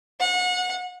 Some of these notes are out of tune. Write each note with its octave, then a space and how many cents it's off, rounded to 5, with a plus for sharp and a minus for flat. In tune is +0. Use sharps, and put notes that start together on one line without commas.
F#5 -30